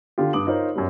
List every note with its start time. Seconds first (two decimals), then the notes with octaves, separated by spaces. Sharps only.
0.18 D3 F4 G4
0.33 G2 D6 D#6 F#7
0.47 D#4 F4 A#4 C5 C#5
0.76 F#2 G3